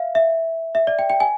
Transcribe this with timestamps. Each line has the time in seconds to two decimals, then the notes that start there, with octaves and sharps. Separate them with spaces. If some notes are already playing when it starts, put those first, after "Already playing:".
Already playing: E5 F5
0.15 E5
0.75 E5
0.87 D5
0.99 G5
1.10 G5
1.20 G#5